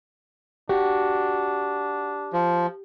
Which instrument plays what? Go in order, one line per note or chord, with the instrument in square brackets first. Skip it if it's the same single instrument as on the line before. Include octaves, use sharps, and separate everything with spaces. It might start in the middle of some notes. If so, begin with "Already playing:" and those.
[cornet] D4 [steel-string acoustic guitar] F#4 [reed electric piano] G4
[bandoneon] F3